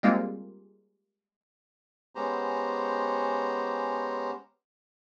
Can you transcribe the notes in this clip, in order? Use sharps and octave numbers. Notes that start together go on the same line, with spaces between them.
G3 G#3 A#3 C4 F4
G#3 B3 C#4 G4 C5 A#5